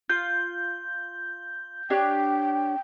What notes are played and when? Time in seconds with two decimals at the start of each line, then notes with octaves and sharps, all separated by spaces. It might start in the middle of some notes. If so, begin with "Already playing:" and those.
0.10 F4 G6
1.90 D4 G4 C#5 G5